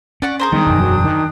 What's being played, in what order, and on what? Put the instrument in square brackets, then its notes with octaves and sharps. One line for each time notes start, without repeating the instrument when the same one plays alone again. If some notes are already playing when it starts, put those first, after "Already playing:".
[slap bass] C#4 [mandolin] D5 F#5 C#6
[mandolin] G#4 A#4 C5
[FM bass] D#3 [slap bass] G3 G#3 B3 [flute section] D4 G5 D#6
[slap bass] E1 F#2
[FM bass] F#3
D#3